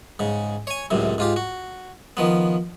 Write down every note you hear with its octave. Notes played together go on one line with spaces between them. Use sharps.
G#2 C#3
C#5 G#5
C#2 F#2 A2 C3
G#2 F4 G4
F#4
D#3 F3 B3